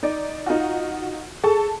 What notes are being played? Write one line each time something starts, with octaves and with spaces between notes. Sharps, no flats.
D#4 D5
D#4 F4 F#4
G#4 A4 A5